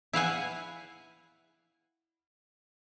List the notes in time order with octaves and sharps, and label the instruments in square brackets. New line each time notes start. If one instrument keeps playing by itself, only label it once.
[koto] E4 F5 F#5 G#5